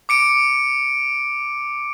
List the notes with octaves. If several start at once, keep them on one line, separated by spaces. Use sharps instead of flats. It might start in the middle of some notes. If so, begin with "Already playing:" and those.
D6 C#7 D7